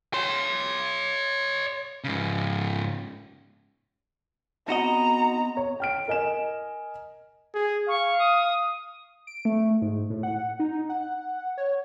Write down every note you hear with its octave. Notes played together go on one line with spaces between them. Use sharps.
C#5 C6
G#2 C#3
B3 C4 D#4 F#4 D#5 A#5
C#5
G5 F6 D7
A#4 D#5 G#5 E7
G#4
F5 C#6
D#6
D7
A3
G#2
A2
F#5
D#4
F#5
C#5